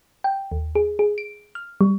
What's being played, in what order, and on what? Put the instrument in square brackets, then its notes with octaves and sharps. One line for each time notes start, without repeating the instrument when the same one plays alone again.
[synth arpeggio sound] G5
D#2
G#4
G#4
D7
F6
G3